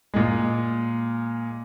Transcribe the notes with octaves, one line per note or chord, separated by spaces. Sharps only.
A#2 G#3